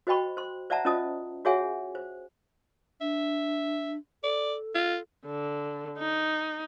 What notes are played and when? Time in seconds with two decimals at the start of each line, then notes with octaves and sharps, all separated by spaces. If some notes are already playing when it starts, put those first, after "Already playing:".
0.07 F#4 C5 D#5 G5 B5 C#6
0.37 C5 C6
0.70 C5 D5 E5 F#5 A5 A#5
0.85 C#4 F4 C5 D#5 A5 D#6
1.45 F#4 G#4 C#5 E5 F#5 G#5
1.95 C5
3.01 D4 E5
4.24 A4 D5
4.75 F4
5.26 D3
5.99 D#4